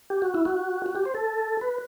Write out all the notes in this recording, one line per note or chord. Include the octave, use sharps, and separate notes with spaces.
G4
F#4
E4
F#4
F#4
G4
C5
A4
B4